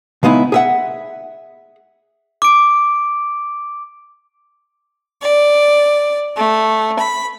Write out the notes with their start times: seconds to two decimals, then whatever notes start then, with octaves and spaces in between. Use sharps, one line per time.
0.23 C#3 G#3 B3 D#4 E4
0.52 G#4 E5 F#5
2.42 D6 D7
5.22 D5
6.37 A3
6.99 B5